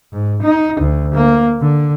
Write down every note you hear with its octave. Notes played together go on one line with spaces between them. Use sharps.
G#2
D#4
D2
A#3
D3